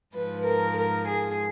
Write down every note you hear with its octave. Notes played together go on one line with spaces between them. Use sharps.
G#2 F3 B4
A#4
A#4
G#4